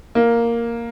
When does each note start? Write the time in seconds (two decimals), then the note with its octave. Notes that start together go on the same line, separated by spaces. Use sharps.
0.15 A#3